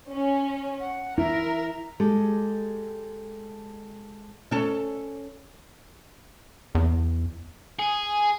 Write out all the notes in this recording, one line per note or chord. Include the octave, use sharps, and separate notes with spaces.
C#4
F#5
E4 A#4 E5
G#3 G4 A4
C#4 A4
E2
G#4